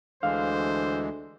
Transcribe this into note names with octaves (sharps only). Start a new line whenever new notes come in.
D2 D3 E3 G#3 C5 F5